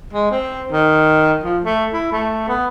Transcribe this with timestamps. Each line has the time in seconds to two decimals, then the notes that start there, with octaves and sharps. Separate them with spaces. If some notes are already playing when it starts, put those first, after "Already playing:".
0.13 G#3
0.31 C4
0.72 D#3
1.44 F3
1.65 A3
1.94 E4
2.12 A3
2.48 B3